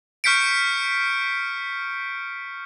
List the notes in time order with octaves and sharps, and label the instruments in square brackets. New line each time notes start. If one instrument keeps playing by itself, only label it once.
[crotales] C#6 F6 G6 B6 C#7 D7